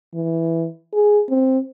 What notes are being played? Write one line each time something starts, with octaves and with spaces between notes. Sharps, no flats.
E3
G#4
C4